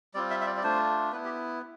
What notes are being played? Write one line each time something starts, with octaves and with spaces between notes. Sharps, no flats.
G3 C4 F4 D5
E5
E5
D5
D5
A3 D4 F4 C5
B3 E4 B4
G4